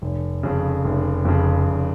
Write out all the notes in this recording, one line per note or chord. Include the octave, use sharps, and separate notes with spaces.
F1
F2 C#3
F1
F2 C#3
F1